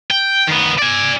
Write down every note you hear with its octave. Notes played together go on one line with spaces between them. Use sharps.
G5
D#3 B3
D5 G#5